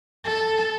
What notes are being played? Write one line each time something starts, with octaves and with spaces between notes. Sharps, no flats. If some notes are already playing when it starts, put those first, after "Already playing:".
A4